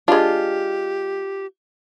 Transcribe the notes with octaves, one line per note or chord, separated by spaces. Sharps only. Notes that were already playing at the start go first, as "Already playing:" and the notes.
G#3 D4 F4 G4